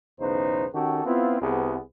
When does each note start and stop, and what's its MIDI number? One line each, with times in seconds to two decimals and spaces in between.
0.20 0.65 35
0.20 0.65 40
0.20 0.65 49
0.20 0.65 63
0.20 0.65 71
0.20 0.65 72
0.74 1.02 51
0.74 1.02 61
0.74 1.02 66
0.74 1.02 67
0.74 1.02 69
1.06 1.39 59
1.06 1.39 60
1.06 1.39 64
1.06 1.39 65
1.41 1.78 36
1.41 1.78 59
1.41 1.78 68